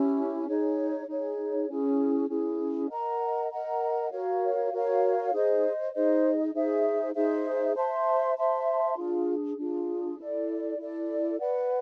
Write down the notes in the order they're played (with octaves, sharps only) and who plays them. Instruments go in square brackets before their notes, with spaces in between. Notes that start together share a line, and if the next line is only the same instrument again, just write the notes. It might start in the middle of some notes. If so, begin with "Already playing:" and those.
Already playing: [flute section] C#4 E4 G4
D#4 G#4 C#5
D#4 G#4 C#5
C#4 E4 G#4
C#4 E4 G#4
A#4 D#5 F#5 A#5
A#4 D#5 F#5 A#5
F#4 A#4 C#5 F5
F#4 A#4 C#5 F5
D#4 G#4 C5 D#5
D#4 G#4 C5 D#5
D#4 G#4 C5 E5
D#4 G#4 C5 E5
C5 E5 A5 C6
C5 E5 A5 C6
D4 F4 G#4
D4 F4 G#4
E4 A4 D5
E4 A4 D5
B4 D5 F#5